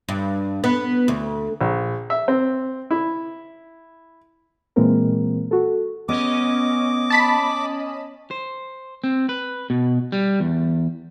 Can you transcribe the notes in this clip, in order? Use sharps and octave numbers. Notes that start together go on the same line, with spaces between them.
G2
B3
D2
A#1
E5
C4
E4
A#2 E3 G#3 A#3 C4 A#4
F#4 A4
B3 C#4 D#5 D6
A5 B5 B6
C5
C4
B4
B2
G3
E2